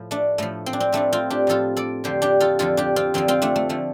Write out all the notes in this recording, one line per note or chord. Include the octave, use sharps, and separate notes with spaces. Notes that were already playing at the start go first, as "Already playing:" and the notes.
Already playing: A2 F3
A3 D4
A2 F3 A3
C4
D4
C4
A2 F3 A3 D4
C4 F4
D4 G4
A2 F3 F4 A4
A4 D5
F2 D3 F3 G4 C5
D4 G4
F4 A4
F2 D3 F3 F4 A4
D4 G4
C4 F4
F2 D3 F3 C4
C4 F4
A3 D4
A3
D3 F3 A3